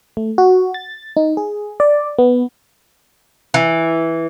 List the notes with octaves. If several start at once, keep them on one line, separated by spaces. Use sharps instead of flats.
A3
F#4
A6
D#4
G#4
D5
B3
E3